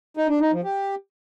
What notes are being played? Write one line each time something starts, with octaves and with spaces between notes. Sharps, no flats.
D#4
D4
D#4
F3
G4